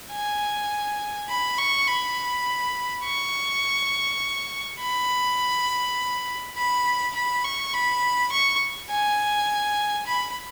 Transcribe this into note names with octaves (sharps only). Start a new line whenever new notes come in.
G#5
B5
C#6
B5
C#6
B5
B5
B5
C#6
B5
C#6
G#5
B5